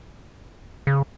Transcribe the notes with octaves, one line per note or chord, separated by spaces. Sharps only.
C#3